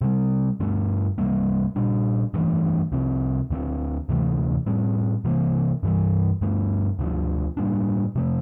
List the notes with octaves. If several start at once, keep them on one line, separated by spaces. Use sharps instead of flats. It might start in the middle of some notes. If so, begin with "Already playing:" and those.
C3 G3 C4
G2 D3 A3
C2 C3 G3 A#3
A#2 G3 D4
G2 E3 A3
C2 C3 F3 C4
D2 D3 F3 C4
D2 C3 E3 A3
A2 G3 C4
C3 E3 A#3
G2 E3 G3
G2 D3 A3
D2 D3 F3
A2 G3 A#3 D4
C3 F3 A3